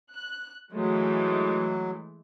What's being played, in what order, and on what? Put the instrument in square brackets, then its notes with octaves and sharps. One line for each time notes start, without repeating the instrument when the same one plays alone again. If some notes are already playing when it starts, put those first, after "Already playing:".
[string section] F#6
[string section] E3 G#3 A3 [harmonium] F#3